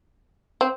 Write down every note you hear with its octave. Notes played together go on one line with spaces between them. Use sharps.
C4